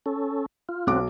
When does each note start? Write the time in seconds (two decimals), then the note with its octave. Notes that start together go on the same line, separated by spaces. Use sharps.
0.06 C#4 A4
0.69 F4
0.87 B1 C4 F#4 D6